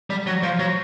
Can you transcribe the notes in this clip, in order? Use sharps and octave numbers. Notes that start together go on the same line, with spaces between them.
G3
F#3
F3
F#3